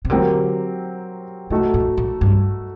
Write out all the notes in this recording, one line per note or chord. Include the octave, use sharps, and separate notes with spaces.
C3
D3 F#3 C4 G4 A#4
C3 A3 D#4 F#4 A4
A2
A2
G2